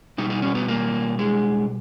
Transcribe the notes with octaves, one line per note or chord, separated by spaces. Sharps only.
B2 G3 D#4
D#4
C#4
B3
A#3
G#3